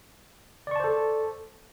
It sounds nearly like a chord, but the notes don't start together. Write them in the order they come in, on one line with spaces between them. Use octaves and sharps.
D5 C#6 A5 C5 A4